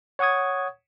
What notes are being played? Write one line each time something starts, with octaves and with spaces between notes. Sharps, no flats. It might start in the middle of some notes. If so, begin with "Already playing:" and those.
C#5 F#5 C#6 D#6 G#6